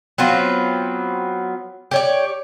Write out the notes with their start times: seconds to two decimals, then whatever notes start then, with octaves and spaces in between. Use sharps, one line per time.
0.18 F#3 B3 C4 F4
1.91 G4 C#5 D5